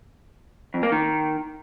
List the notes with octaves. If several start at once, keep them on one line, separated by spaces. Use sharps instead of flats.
F2
A#3
D#3